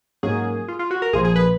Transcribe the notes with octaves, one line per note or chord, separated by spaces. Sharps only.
G#2 F#3 A#3 C#4 G#4
F4
F4
F#4
A#4
A#1 A#2 F3 G#4
G#4
B4